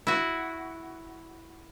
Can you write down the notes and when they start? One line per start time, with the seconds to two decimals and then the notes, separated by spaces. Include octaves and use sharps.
0.07 E4 F#4